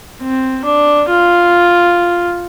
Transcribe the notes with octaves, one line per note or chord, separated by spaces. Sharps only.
C4
D4
F4